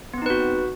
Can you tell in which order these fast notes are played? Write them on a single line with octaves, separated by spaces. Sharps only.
B3 C4 D#4 B4 F#4